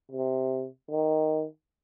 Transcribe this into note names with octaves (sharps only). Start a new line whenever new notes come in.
C3
D#3